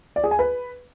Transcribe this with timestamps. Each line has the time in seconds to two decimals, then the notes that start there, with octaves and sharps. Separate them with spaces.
0.16 D5
0.24 G#4
0.31 G#5
0.39 B4